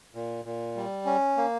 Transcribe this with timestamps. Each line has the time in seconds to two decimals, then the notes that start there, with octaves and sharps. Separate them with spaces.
0.15 A#2
0.45 A#2
0.76 G3
1.06 C#4
1.37 A#3